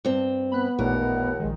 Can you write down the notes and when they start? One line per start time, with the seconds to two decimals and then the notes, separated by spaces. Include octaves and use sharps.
0.05 G2 C4
0.52 B3 B5 F#6
0.79 A1 D#2 A#2 A3 A#4 F#5
1.40 A#1 D#3 G#3